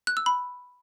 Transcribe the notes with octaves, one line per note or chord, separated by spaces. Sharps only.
F#6
E6
B5